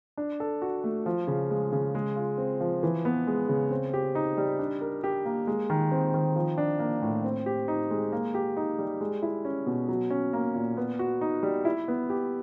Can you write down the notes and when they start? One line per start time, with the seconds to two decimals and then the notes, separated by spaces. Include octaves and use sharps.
0.17 D4
0.40 A4
0.62 F#4
0.84 A3
1.06 F3
1.27 C#3
1.50 G#3
1.72 C#3
1.95 G#3
2.16 F4
2.38 C4
2.60 F3
2.83 E3
3.05 B3
3.27 G#3
3.49 C#3
3.71 C4
3.94 G4
4.15 D#4
4.37 G3
4.59 D4
4.81 A#4
5.04 G4
5.25 A#3
5.47 G#3
5.70 D#3
5.92 C4
6.14 D#3
6.36 F3
6.58 D4
6.79 A#3
7.02 A2
7.24 C4
7.46 G4
7.68 D#4
7.91 G#3
8.13 A#3
8.34 G4
8.57 D#4
8.79 G3
9.01 G#3
9.22 E4
9.45 C#4
9.66 B2
9.89 F#3
10.10 C#4
10.33 A#3
10.55 A#2
10.77 B3
10.99 F#4
11.21 D#4
11.43 G3
11.65 E4
11.88 B3
12.10 G4